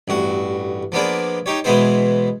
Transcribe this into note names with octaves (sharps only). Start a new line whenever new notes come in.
A1 G2 F#4
F3 A#3 B3 D4 G#4
D#4 G4 C#5
B2 E3 G#3 B3 G#4 C5